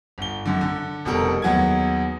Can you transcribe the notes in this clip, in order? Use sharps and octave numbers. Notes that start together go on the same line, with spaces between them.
G1 G7
F#2 D3
D3
F1 B2 G3 A4 A#4
D#2 F#3 B3 G#4 G#6